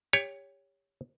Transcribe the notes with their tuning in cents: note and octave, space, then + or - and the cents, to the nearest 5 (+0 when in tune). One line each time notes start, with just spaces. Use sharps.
G4 +25 C#5 +10